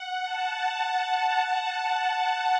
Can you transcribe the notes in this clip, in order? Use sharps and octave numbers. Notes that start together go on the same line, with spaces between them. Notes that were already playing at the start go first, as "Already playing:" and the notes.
Already playing: F#5
A5